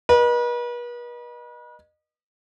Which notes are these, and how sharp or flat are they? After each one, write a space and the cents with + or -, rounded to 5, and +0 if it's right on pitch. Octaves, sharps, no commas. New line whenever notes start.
B4 -40 D#5 -30